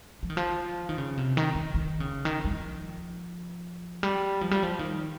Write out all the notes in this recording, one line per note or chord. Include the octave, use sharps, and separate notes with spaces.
F3
D#3
F3
D#3
C#3
C3
D#3
D#3
D#3
C#3
D#3
G3
F3
G3
F3
G3
F3
D#3